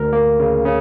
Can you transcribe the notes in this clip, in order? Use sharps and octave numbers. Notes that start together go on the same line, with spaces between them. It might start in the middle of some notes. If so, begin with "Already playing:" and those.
Already playing: D2 A#4
A#3
C#3
C#3